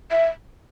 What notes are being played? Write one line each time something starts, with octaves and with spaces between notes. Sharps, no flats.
E5